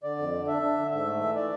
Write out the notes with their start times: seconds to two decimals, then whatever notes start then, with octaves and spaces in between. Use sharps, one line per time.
0.03 D3 D5
0.18 F2
0.32 D3
0.47 D4 E5
0.62 D4
0.77 D3
0.91 G#2 E5
1.06 A3
1.21 E3
1.36 D5